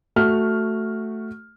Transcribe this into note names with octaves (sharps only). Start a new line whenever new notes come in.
A3 F#4 F6